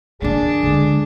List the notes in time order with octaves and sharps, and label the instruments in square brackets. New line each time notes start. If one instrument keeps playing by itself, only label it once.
[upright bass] D#3 A#3 [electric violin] D4 [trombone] G#4
[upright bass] D3 G#3